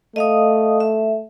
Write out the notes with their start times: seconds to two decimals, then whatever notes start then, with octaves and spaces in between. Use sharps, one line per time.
0.16 A3 D#5 F5 D#6
0.80 E5